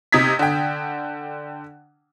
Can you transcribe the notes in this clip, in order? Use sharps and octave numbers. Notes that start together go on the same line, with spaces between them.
C3 D#4 D#6 G#6 B6
D3 G5